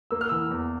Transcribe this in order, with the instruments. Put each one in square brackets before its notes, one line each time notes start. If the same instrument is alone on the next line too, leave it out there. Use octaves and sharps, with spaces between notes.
[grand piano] A#3 E6
F6
E3 E6
E2